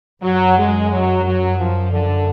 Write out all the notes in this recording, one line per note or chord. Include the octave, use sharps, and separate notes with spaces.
F#2 F#3
G#3
F#3
F#3
F3
D3